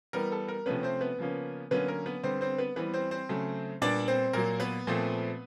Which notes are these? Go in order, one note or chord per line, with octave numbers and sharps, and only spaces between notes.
E3 G3 B3 A#4
A4
A#4
C3 F3 A3 B3 C#4 B4
C4 C5
B3 B4
C#3 F3 A#3 C#4
D3 F#3 A#3 B3 C#4 B4
A#4
B3 B4
D3 G3 B3 C4 C5
C4 C5
B3 B4
E3 G3 B3 C4 B4
C4 C5
C4 C5
C#3 F#3 A3
A#2 G3 B3 D4 D5
C4 C5
A#2 F#3 A#3 A#4
B3 B4
A#2 F3 A3 C4